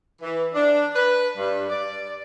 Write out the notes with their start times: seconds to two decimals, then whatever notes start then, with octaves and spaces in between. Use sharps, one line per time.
0.22 E3
0.54 D4
0.96 B4
1.37 G2
1.69 D5